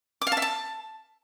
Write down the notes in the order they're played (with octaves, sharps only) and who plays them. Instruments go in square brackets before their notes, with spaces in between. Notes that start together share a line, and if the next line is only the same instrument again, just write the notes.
[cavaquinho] D6
F5
A5
E5
A5